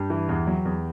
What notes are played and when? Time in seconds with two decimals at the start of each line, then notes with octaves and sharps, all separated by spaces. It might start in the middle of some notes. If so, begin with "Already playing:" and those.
Already playing: G2 G4
0.10 E3
0.29 E2
0.47 F#3
0.65 E2